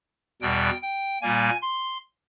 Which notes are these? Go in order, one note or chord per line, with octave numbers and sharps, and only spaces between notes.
E2 B2 G3 G5
G5
A#2 G3 A#3 G#5
C6